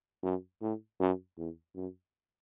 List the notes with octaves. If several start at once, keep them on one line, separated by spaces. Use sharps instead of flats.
F#2
A2
F#2
E2
F#2